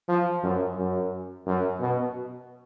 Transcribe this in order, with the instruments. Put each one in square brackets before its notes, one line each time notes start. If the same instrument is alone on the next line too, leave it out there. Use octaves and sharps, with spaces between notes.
[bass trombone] F3
F#2
F#2
F#2
B2